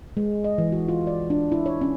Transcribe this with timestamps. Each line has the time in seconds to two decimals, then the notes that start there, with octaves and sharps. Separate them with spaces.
0.17 G#3
0.44 D#5
0.58 E3
0.72 F#4
0.88 F4
1.07 D5
1.30 D4
1.52 E4
1.66 C#5
1.81 C#4